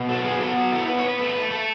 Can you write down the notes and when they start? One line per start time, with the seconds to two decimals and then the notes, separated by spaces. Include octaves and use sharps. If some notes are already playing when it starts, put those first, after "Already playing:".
Already playing: B2
0.09 F#3 A4
0.25 B3 G#4
0.40 B3 A4
0.57 F#3
0.72 E4 A4
0.88 B3 B4
0.99 C#5
1.03 B3
1.09 B4
1.19 A3 B4
1.36 A3
1.51 A3 A4